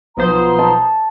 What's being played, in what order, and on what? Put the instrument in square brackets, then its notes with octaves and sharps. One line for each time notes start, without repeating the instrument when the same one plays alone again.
[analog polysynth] B1 F3 C5 [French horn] B3 [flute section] A#5 D#6
[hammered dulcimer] A5